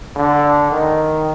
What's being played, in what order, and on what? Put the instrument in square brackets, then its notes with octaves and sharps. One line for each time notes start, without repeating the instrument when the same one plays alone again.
[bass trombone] D3
D#3